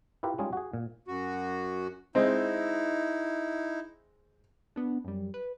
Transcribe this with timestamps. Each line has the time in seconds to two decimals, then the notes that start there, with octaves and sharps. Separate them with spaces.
0.23 E4 F4 G4 A#4 B4 E5
0.38 G3 G#3 C#4 D#4 F4 G#4
0.53 F#4 G#4
0.74 A#2
1.08 F#2 F#4
2.15 G#3 C4 D#4 E4
4.76 B3 D4
5.05 F#2 G3
5.34 B4